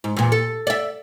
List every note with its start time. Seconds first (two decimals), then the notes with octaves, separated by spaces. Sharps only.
0.04 G#2
0.16 E2 A#2
0.32 A4
0.67 D5 E5